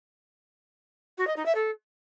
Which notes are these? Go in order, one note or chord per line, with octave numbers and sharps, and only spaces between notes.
F#4
D#5
D#4
E5
A4